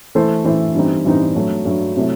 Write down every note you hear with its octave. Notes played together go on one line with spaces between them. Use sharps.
E3 A3 E4 A4 C5
E3 A3 E4 A4 C5
G2 E3 G3 C4 D#4
G2 E3 G3 C4 D#4
G2 F#3 A3
G2 F#3 A3
C3 F#3 A3 E4